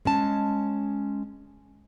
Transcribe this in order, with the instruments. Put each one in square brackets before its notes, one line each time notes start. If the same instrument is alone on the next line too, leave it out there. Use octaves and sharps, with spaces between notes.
[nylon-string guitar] G#3 C#4 A5